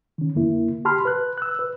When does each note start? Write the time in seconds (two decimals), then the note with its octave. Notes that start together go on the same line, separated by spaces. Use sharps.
0.18 D#3 C#4
0.35 F2 D3 A#3 E4
0.85 G4 A5 B5 C6 F6
1.05 B4 F#6
1.38 E6 F#6
1.59 B4